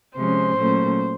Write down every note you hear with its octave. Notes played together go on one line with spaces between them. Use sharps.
C3 F3 G#3 C#4 C5
A#2 F#3 A3 C#4